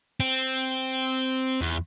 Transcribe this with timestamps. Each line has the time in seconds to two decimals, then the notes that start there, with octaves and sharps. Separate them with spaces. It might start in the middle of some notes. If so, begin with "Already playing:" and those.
0.20 C4
1.61 E2